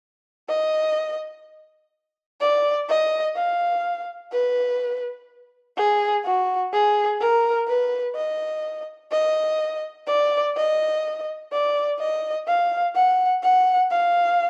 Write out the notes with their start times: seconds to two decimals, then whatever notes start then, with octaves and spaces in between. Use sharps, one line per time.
0.49 D#5
2.40 D5
2.89 D#5
3.36 F5
4.33 B4
5.77 G#4
6.25 F#4
6.73 G#4
7.21 A#4
7.68 B4
8.16 D#5
9.12 D#5
10.07 D5
10.56 D#5
11.52 D5
11.99 D#5
12.47 F5
12.95 F#5
13.43 F#5
13.91 F5